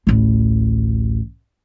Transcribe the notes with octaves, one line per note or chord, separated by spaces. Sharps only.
A1 D2